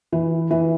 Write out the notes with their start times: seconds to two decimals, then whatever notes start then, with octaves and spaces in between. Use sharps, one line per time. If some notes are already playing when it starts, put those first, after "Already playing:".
0.12 E3
0.51 E3